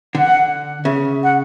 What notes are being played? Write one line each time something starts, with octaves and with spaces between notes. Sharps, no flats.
D3 F#5
C#3 E5
F#5